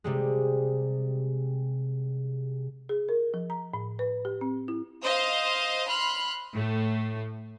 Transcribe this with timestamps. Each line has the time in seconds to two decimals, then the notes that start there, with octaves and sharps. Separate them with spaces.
0.04 C3 G3 G#3
2.89 G#4
3.09 A#4
3.34 F3
3.50 A#5
3.74 A2
3.99 B4
4.25 G4
4.41 C4
4.68 E4
5.02 C5 D#5 F5
5.88 B5 C6 F6 F#6
6.54 A2 A3